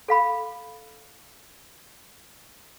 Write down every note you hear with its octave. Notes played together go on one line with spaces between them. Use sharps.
A4 F5 B5